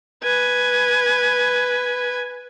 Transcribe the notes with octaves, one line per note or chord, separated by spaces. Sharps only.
B4 G#5